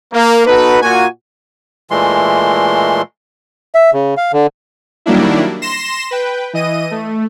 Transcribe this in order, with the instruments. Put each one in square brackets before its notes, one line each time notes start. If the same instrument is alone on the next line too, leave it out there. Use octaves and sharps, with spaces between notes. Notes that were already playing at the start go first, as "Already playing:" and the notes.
[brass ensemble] A#3
B3 D#4 F#4 A4 B4
A#2 F#4 G#5
[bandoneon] A#2 E3 G#3 A3 C6
E5
C#3
F5
D3
[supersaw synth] D#3 F#3 G3 A#3 D4 E4
C6 A#6 E7
B4 G5
E3 D#5 D#7
A3